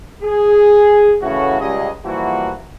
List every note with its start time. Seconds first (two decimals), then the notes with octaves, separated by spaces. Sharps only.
0.23 G#4
1.22 A2 C#3 E3 A3 C#4 F#4
1.60 C#2 G3 G#4 D#5
2.05 E3 F3 G3 A#3 E4 F#4